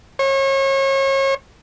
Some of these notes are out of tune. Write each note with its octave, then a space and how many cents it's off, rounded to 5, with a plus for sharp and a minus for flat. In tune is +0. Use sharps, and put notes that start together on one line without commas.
C#5 -35